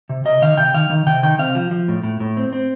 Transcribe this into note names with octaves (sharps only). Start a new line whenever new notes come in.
C3
C3 D#5
D#3 F5
C3 G5
D#3 F5
D#3
C3 G5
D#3 G5
C3 F5
F3
F3
A2
A2
A2
C4
C4